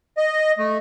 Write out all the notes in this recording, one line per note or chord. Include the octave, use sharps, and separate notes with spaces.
D#5
A3